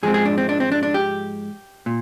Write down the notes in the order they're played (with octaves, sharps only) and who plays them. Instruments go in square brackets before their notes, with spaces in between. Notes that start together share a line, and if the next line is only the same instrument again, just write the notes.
[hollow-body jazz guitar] G#2 F3 G#3 C4 G#4
G#4
D4
C4
D4
C4
D4
D4
G4
A#2